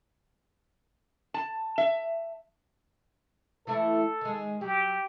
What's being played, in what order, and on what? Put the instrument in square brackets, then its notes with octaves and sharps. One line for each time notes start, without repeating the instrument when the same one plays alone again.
[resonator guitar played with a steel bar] A5
E5
[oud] E3 A3 E4 [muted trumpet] A4
[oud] D#3 G#3
[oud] F#3 [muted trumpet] G4